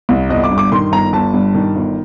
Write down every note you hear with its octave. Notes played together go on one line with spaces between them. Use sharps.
C2
G1 D#5
D6
G2
D6
D#3 C6
G1 A#5
G1 A5
G2
D#3
G1